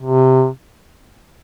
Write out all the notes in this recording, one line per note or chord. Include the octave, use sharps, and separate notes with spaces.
C3